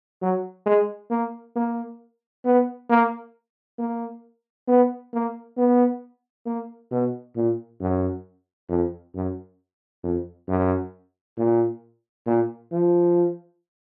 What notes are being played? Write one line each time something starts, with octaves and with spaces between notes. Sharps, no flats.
F#3
G#3
A#3
A#3
B3
A#3
A#3
B3
A#3
B3
A#3
B2
A#2
F#2
F2
F#2
F2
F#2
A#2
A#2
F3